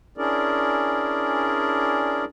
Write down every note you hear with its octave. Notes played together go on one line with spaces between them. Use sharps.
C#4 D4 E4 G#4 A#4 D5